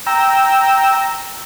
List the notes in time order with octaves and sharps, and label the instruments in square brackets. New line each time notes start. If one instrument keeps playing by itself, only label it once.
[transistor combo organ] G5 A#5 E6